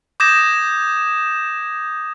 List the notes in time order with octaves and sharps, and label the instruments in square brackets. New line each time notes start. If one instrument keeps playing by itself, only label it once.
[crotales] D6 D#6 G6 G#6 A#6 E7